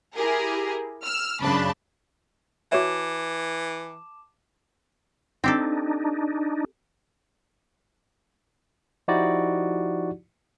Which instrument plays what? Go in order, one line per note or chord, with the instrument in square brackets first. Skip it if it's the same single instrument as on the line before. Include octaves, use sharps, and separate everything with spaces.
[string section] E4 G4 G#4 A#4
E6 F6
F#2 C#3 D4 A5 B5
[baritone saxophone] E3 [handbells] F#4 C#5 E5 [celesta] A5 D6 E7
[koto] C4 G4 A4 [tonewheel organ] D4 D#4
[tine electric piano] F3 D#4 E4 F#4 G4 D5